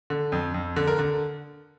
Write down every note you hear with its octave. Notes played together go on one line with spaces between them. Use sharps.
D3
F2
F2
D3
A#4
D3